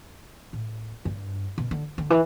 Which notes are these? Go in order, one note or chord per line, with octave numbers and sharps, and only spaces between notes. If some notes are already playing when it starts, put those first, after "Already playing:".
A2
G2
B2
D3
D3
E3